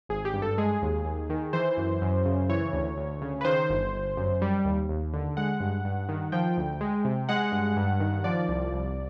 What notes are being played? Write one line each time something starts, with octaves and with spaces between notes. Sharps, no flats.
G#1 G#4
G4
G2
A4
G#3 G#4
D#2
D#2
D#3
E3 C5
F#2
F#2
C#3
E3 C#5
D2
D2
C#3
B4
D#3 C5
G1
G1
F#2
G3
D#2
D#2
D3
G#3 F#5
G2
G2
D#3
F3 G5
D2
G#3
C3
G#3 F#5
G2
G2
D#3
F3 D5
C2
C2